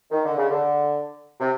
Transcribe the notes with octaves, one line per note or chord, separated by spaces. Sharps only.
D#3
D3
C#3
D3
C3